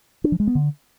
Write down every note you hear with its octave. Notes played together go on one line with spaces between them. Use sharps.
D4
F3
G#3
B3
D3